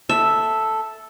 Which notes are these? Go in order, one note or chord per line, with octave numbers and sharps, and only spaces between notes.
A4 E5